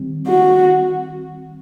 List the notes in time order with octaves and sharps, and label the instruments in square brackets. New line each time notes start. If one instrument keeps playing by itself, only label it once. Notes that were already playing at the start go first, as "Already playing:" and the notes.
Already playing: [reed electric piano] D#3 G3 C4
[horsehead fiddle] F#4